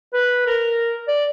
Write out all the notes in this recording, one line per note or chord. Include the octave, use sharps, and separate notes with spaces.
B4
A#4
D5